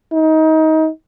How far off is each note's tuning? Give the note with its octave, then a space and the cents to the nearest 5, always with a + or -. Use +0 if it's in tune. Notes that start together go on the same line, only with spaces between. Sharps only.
D#4 +25